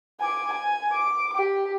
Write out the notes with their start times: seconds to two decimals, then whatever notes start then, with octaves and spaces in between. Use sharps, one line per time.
0.21 G#5 D6
0.54 G#5
0.93 D6
1.36 G4